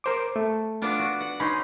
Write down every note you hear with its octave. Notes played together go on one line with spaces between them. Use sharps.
A#4 C5 D6
A3
B3 D4 F4
F#4
F#5
C#4 D#4 B5 C6